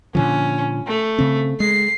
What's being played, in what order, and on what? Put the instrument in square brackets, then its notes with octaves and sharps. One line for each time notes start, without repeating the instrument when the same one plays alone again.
[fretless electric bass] A#2 D3 F3 [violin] C#4
[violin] A3
[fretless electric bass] C#3 C4
[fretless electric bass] G#3 [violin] C7